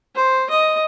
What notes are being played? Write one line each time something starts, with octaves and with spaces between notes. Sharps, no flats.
C5
D#5